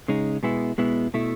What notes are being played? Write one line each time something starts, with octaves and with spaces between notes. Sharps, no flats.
C#3 G#3 D#4
B2 G#3 B3 E4
B2 G#3 B3 E4
B2 A3 E4